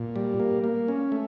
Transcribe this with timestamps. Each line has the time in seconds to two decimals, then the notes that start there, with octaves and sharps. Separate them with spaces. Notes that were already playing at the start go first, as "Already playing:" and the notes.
Already playing: A#2
0.16 G3
0.40 A#3
0.64 A#3
0.88 C#4
1.12 A3